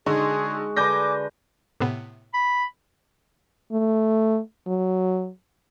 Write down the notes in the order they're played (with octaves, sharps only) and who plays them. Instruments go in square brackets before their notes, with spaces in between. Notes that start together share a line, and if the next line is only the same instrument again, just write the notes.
[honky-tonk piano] D3 D#4 [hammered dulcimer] G#3 F#4 C6 [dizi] G#4
[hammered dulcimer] D3 B4 [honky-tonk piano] G#5 G6 A#6 [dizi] D6
[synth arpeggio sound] A2 C3 B3
[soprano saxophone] B5
[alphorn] A3
F#3